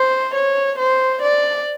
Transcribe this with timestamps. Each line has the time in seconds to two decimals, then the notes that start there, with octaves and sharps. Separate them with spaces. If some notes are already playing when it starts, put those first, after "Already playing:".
Already playing: C5
0.35 C#5
0.79 C5
1.22 D5